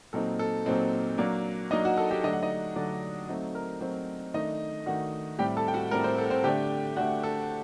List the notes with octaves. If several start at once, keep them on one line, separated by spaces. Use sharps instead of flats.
A#2 F#3 C4 D#4 A4
A4
A#2 F#3 C4 D#4 C5
F#3 A#3 D4
F#3 A#3 D4 D#4 D#5
F#4 F#5
A4 A5
G4 G5
D3 F#3 A3 D4 D#5
F#5
D#4 D#5
D3 F#3 A3 D4 D5
F#3 A3 C4 D#4
A#4
F#3 A3 C4 D#4 C5
D#3 A3 D4 D#4 D#5
D#3 A3 D4 F#4 F#5
A2 G3 C4 G4 G5
A4 A5
G5
F#4 F#5
A2 G3 C4 A#4
C4 C5
A4
C4 C5
D3 A3 D4 G4 G5
D3 A3 D4 F#4 F#5
A4